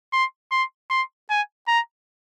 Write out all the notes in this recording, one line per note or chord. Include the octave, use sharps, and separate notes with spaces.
C6
C6
C6
G#5
A#5